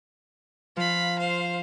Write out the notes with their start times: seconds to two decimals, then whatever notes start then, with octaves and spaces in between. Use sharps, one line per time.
0.77 F3 F5 B5
1.18 C5 F5